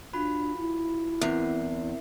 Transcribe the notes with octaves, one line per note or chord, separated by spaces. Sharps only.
D4 F4 F#4 B5
E4
E2 C4 A#4 C7